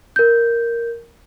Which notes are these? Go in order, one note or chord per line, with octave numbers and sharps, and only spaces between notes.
A#4 G6